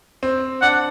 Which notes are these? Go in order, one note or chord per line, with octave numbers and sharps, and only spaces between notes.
C4
D4 F#5